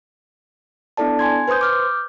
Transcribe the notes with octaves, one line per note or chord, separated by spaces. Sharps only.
B3 D4 E4 A4 D5 A5
G#5 C6 G#6
B4 C5 C6 D#6 G6
D6 F6 G6